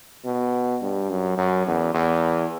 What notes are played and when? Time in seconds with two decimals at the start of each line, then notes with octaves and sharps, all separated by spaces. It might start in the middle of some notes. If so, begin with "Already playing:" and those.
0.25 B2
0.82 G2
1.10 F#2
1.38 F#2
1.67 E2
1.94 E2